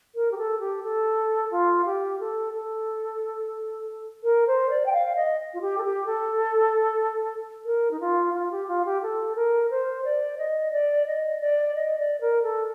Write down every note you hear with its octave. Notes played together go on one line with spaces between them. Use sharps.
A#4
G4
A4
G4
A4
F4
G4
A4
A4
A#4
C5
D5
G5
F5
D#5
F4
G4
A4
G4
A4
A#4
D#4
F4
F4
G4
F4
G4
A4
A#4
C5
D5
D#5
D5
D#5
D5
D#5
D5
A#4
A4